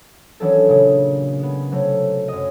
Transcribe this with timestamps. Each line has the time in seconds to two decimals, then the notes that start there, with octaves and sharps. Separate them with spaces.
0.40 D#3 E3 F#3 C#4 D4 A4
0.68 A#2 C#3 D4
1.39 G#3 B3
1.72 C3 F#3 A3
2.28 F#2 D#5